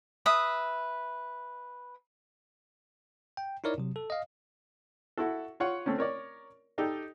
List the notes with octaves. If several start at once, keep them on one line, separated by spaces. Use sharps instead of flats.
B4 E5 D#6
G5
D#4 E4 A#4 C#5 D5
C3 F#3
A4
D#5 F5
E4 F#4 A4
F4 C#5 F#5
A3 C4 C#4
A#4 C#5 D5
D#4 G4 A4 D5